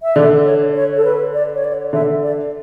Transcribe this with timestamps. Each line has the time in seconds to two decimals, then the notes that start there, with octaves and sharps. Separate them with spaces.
0.03 E5
0.16 D3 D5
0.45 C#5
0.75 C#5
0.96 A4
1.04 B4
1.34 D5
1.55 C#5
1.64 D5
1.93 D3 E5
2.22 D5